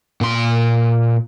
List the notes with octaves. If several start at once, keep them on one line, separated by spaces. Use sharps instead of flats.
A#2 C6